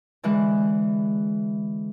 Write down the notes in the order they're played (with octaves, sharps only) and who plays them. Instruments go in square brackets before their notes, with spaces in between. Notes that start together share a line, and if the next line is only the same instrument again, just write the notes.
[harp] D3 E3 G#3 F#6